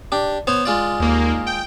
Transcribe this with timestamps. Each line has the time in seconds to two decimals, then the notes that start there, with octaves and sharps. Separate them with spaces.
0.12 D4 G4
0.47 B3 C5 C#5
0.65 G#3 F4 D5
0.99 D#2 A#3
1.47 G5